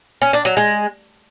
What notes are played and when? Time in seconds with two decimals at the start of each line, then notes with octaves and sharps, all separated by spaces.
0.22 C#4
0.33 D4
0.45 F#3
0.57 G#3